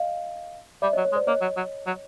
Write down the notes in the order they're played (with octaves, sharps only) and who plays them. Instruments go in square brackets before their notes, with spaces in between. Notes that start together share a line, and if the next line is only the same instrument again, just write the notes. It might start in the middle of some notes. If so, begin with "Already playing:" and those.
Already playing: [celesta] D#5 F5
[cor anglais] G3 [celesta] D5 E5
[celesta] C#5 D#5
[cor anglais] F#3
[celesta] C#5
[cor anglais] G#3
[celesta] C5 D5
[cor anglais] A#3 [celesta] C#5 D#5
[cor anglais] F#3
F#3
F#3